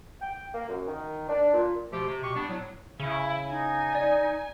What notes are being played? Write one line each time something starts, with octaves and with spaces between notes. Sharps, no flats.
G5
A#3
F#2
D#3
D4
A#2
B2 F3 A3 G4
C3
B2 G4 C#6
G3 B3 D4
A2 F#3
C#3 E4
D#4 G#5
D5 A#6